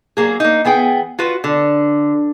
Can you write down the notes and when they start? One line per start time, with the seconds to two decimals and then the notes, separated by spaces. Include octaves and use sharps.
0.17 F#3 A#3 G#4
0.40 A#3 D#4
0.65 E3 B3 G#4 G5
1.19 F4 F#4 B4
1.44 D3